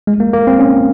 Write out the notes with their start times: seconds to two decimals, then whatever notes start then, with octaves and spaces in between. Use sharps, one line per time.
0.07 G#3
0.20 A#3
0.33 A#3
0.47 C4
0.59 C#4